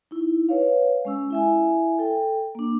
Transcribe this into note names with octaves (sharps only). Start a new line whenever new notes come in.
D#4 E4
B4 C#5 F5
G#3 C#4 E6
E4 E5 G#5
A4 G5
A#3 D4